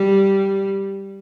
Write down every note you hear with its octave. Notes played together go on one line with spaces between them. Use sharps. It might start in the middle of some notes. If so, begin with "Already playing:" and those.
Already playing: G3